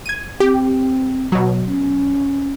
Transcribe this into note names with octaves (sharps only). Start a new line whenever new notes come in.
G#6 D#7
C4 G4
B2 F#3
C#4